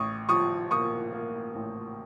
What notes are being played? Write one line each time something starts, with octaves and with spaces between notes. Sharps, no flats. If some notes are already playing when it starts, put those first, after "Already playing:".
Already playing: A1 C#6 D#6
F3 C#6 D#6
A#3 C#6 D#6
A#3
A1